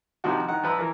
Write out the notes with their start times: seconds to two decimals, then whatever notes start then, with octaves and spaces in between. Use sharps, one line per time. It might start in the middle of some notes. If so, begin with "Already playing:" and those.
0.24 C3 D#3 F3 F#4
0.48 D#3 F#5
0.64 F3 B4 A#5 B5 E6
0.79 E3 A#4